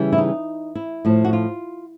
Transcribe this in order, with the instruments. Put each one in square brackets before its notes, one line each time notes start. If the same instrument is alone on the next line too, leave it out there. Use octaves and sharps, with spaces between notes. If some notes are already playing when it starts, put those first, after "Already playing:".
Already playing: [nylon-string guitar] C#3 E3 G3
E4
D#4
E4
A2 F3
F#4
F4